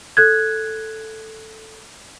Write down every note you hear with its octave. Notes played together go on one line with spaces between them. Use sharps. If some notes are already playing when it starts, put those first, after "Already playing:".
A4 F#6 G#6